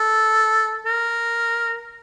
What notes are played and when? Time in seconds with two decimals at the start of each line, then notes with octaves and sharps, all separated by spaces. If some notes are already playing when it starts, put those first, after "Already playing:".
Already playing: A4
0.86 A#4